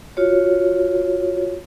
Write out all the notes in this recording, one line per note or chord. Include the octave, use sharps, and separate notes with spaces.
F4 F#4 C#5